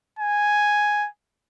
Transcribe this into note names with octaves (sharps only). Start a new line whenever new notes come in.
G#5